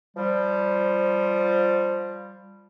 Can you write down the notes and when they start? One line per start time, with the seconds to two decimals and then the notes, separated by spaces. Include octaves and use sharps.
0.17 F3 G3